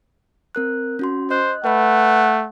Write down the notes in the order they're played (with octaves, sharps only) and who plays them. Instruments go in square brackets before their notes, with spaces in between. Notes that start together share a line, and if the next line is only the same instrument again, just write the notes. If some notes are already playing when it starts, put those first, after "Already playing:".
[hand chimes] C4 A#4 F#6
C#4 F#4 C6
[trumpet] C5 [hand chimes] D#5 F#6
[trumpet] A3 [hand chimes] B4 B5 [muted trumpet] F#5